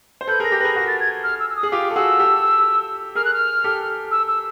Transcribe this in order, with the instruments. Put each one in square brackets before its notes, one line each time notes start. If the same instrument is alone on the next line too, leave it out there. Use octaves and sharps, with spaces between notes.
[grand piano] C5
[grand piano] A4 B4 [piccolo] G6
[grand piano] G#4 A#4 [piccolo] A#6
[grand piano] G4 A4
[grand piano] B4 [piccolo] A#6
[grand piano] G#4 A#4
[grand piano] F#4 G#4 [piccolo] A#6
[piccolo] A6
G#6
F6
E6
E6
D#6
[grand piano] G#4
[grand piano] F4 G4 [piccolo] D6
[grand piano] A4
[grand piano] F#4 G#4 [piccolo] E6
[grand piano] G4 A4
[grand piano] G#4 A#4 [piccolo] F6
[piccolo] F#6
F6
[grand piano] G4 A4
[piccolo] E6
E6